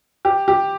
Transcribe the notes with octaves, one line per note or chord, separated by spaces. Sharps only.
G4
G4